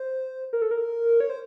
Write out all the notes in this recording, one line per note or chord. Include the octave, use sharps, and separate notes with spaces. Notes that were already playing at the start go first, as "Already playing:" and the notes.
Already playing: C5
A#4
A4
A#4
C#5
C5